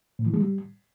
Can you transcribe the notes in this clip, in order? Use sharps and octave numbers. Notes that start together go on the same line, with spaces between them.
A2
E3
G#3
G3